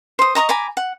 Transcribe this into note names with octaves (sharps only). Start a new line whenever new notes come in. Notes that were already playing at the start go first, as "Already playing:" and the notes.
C5 D#6
D#5 A#5 C#6 D#6
G#5 A#5 B5 D6
F#5